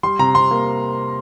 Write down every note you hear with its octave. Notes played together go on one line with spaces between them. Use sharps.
G3 C6
C3 A#5
C3 C6
A#3